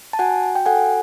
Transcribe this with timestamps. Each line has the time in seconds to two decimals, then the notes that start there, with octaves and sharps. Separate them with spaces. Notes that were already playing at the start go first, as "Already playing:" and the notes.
0.13 A5
0.19 F#4 F#5 G#5
0.55 G5
0.66 A4 F#5 G#5